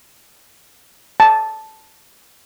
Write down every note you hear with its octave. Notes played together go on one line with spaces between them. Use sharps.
A5